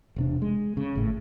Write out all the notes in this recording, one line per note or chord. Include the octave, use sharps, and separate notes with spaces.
E1 C3 D4
G#3
C#3
G#1 A2